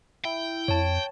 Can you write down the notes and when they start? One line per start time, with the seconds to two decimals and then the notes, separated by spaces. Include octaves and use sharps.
0.25 E4 G5
0.68 F2 C#5 A5